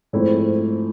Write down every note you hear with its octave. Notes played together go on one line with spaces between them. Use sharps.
G#2 F3 A3 C4 E4